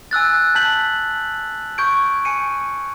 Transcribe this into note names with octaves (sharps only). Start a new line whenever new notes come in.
G#5 E6 F#6 A6
A5 G6 B6 F#7
C#6 G6 G#6 D7
G#5 C#7 D#7